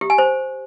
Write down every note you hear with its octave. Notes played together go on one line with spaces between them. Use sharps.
G4
G#5
C5